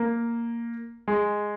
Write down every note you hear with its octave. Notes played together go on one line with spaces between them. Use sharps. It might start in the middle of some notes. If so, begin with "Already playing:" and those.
Already playing: A#3
G#3